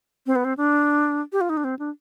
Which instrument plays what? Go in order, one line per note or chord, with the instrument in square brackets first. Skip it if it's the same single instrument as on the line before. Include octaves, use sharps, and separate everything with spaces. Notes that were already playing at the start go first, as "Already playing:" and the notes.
[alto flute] C4
B3
C4
D4
G4
F4
D#4
D4
C4
D4